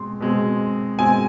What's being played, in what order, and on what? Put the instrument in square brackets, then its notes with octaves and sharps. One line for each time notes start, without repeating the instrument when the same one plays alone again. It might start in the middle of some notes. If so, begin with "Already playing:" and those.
Already playing: [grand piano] B2 G#3 C4 C6
B2 G#3 C4
B2 G#3 C4 G#5